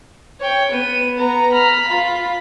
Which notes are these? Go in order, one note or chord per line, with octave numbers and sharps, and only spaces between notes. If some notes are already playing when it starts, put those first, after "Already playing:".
C#5 G5
B3 D#7
B3 A#5
A#5 B5 F6
F4